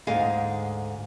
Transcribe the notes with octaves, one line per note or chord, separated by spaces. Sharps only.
D2 G#2 G#4 F5